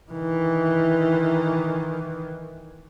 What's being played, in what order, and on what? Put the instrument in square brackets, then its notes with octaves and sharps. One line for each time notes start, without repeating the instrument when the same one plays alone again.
[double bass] D#3 E3